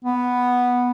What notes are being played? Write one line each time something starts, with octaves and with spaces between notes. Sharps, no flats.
B3